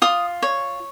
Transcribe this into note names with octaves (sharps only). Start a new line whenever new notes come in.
F4 D#6
C#5